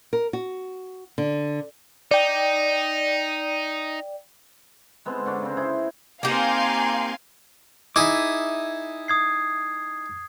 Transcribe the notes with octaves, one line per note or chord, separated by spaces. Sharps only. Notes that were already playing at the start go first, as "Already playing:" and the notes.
A#4
F#4
D3
D#4 D5 G5
G#3 B3 C4 A4
D3 C#4 D4
C#3 C4
E4 G#4 C5
A#3 C4 D#4 G4 F5 G#5 C6
D#4 E4 G#4 E5 D6 G#6
D#6 G#6 C7